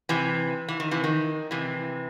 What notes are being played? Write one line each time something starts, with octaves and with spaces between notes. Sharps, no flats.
C3 E3
E3
D#3
C3 E3
D#3
C3 E3